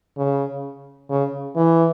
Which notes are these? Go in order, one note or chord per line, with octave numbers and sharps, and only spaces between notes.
C#3
C#3
E3